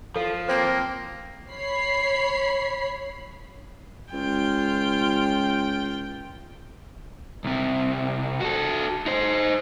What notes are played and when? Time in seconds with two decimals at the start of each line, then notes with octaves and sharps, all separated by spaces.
0.16 F3 A4 F5
0.49 A#3 C4 C5
1.52 C#5 B5 C7
4.13 C#2 F4 G5
7.44 C2 C3
8.41 F#4 A4
9.06 D#4 C5